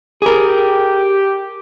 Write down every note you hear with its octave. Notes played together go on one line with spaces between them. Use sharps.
G4 G#4 A#4